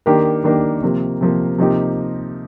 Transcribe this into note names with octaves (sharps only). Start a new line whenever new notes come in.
D#3 A#3 D4 G4 A#4
D#3 A#3 D4 G4 A#4
C3 F3 A#3
C3 F3 A#3
C3 F3 A#3 D#4 G4